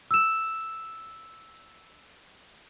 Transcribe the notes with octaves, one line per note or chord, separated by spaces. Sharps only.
E6 E7